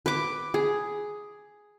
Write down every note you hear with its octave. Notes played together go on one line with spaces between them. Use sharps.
B4 D6
G#4